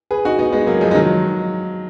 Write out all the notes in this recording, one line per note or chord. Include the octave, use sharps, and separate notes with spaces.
G#4 B4
D#4 F#4
B3 D#4
G#3 B3
F#3 A#3
F3 G#3
G#3
D#3 F#3